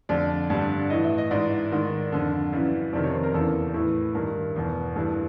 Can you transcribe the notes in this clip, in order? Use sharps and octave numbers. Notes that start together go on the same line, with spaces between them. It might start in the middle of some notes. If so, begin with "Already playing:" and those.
F2 D3 D5
G2 D3
A2 E3 D#5
E5
D#5
G#2 E3 D5
G#2 D#3
F2 D3
F#2 C#3 E3
F2 C3 D#3 D5
C#5
C5
A#4
E2 C#3 E3 A4
A2 E3 A4
G2 D#3 A#4
E2 B2
G2 E3 A4